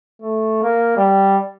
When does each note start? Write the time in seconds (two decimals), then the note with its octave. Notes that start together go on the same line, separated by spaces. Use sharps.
0.22 A3
0.62 A#3
0.97 G3